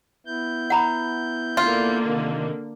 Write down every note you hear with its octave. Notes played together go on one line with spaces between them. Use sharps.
B3 E4 G6
F#5 A#5 B5
D3 A#3 F4
C3 D#3 D#4